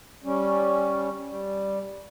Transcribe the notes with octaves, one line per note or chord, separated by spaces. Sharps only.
G3 C#4
G3